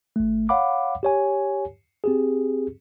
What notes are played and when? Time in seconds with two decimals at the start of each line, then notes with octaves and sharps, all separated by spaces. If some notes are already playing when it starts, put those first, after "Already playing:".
0.16 G#1 A3
0.49 C#5 F5 F#5 B5 D6
1.03 G4 C#5 G#5
2.04 C4 G4 G#4